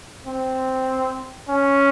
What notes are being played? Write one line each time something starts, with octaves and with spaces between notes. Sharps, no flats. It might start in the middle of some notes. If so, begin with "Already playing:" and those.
C4
C#4